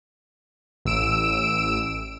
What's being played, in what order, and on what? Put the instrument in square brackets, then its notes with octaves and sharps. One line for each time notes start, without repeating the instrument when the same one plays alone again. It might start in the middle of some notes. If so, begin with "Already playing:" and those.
[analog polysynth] A1 E6 D7 E7